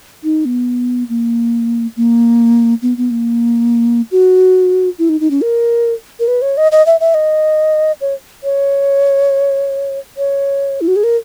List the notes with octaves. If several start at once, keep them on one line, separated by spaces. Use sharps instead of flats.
D#4
B3
A#3
A#3
B3
B3
A#3
F#4
E4
D#4
D#4
C#4
A#4
A#4
B4
C#5
D#5
D#5
E5
E5
D#5
C#5
C#5
C#5
E4
F#4
G#4
A#4